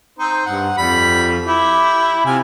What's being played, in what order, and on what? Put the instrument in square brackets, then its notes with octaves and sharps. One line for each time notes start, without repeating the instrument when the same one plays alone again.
[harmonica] C4 D#4 C5
[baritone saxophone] G2 [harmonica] F#5
[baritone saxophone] F2 [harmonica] G3 B5
[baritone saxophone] E4 [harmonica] G4
[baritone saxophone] C3 [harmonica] F4 G#5